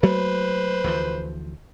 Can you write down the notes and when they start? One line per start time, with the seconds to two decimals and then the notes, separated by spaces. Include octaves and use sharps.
0.03 F#3 A3 A#3 B4 C5
0.84 D2 E3 F3